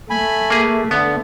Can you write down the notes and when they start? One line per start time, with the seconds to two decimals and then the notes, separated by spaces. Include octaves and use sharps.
0.10 A3 G#5 B5
0.50 A#3 G#4
0.91 D3 B3